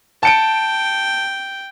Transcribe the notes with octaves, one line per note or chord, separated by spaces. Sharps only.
G5 A5 C#7 D7